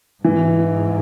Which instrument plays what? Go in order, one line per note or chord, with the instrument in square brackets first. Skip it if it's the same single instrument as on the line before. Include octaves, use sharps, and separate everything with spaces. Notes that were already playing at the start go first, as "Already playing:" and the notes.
[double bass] G#2 [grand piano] E3